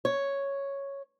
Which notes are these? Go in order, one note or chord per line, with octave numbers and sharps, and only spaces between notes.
C#5